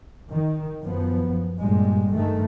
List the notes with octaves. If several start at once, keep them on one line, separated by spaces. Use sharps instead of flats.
D#3
F#2 F3 B3
G2 A#2 G3 G#3
G2 D#3 G#3 A3